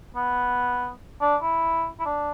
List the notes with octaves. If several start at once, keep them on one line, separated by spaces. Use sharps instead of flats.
B3
D4
E4
E4
D4